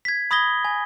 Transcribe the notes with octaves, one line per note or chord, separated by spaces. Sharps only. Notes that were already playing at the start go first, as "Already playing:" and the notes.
G#6 B6
B5 D#6 G#6 A#6 G7
G#5